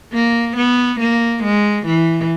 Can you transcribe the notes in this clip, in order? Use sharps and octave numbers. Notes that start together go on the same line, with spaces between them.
A#3
B3
A#3
G#3
E3